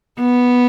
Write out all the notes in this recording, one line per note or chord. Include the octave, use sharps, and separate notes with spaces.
B3